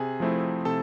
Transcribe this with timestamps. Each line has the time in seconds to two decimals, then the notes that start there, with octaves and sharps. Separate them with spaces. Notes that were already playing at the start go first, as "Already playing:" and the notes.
Already playing: C3 G#4 G#5
0.20 F3 A3 C4 E4
0.65 C3 A4 A5